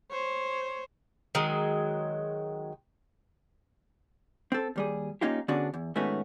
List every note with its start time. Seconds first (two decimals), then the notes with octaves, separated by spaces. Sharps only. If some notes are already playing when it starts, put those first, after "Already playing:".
0.11 C5 C#5
1.35 D#3 F#3 G#3
4.52 C4 A4
4.76 D#2 G3 G#4
5.21 A#3 C#4 D#4 F4 G4
5.48 D3 B3 C#4 D4 F#4 G#4
5.74 E2
5.96 G#2 D#3 A3 B3 C#4 F#4